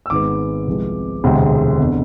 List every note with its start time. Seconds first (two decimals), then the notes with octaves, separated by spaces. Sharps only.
0.06 E6
0.10 G#1 G#2 G#3 B3 D6
0.67 C2 C3 F3 G#3 B3
1.24 E1 D2 C3 G#3 C4
1.79 F1 E2 D3